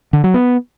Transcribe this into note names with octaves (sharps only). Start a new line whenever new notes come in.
D3
F#3
B3